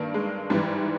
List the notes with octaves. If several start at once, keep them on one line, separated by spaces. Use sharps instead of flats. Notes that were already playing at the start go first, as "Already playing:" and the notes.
Already playing: G2 D#3 A#3
G#3
G#2 E3 G3